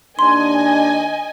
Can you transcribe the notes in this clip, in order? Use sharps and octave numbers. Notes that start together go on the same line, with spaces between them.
D#2 D4 D#5 G#5 C6